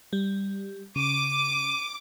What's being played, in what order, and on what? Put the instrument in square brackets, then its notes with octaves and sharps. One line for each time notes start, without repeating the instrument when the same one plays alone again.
[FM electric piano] G3
[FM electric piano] C#3 [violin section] D6 [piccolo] D#7